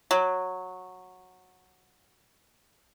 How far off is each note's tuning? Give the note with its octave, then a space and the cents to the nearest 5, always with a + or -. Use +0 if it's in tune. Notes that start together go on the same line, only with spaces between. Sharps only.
F#3 -10